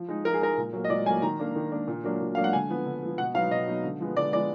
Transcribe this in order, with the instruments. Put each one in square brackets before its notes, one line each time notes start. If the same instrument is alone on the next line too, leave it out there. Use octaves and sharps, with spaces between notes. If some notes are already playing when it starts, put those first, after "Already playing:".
Already playing: [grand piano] F3
G#3 D#4
F3 A#4
G#4
G#3 D#4 A#4
A#2
F#3 A#3
D#5
A#2 D5
F#3 G#5
A#3
D#3 A#5
A#3 D4
D#3
A#3 D4
A#2
F#3 A#3 D4
A#2
F#3 A#3 D4 F5
F#5
D3 G#5
F3 B3
D3
F3 B3
B2 F#5
F#3 B3 D#4 F5
B2 D#5
F#3 B3 D#4
D3
F3 G#3 B3
D3 D5
F3 G#3 B3 D5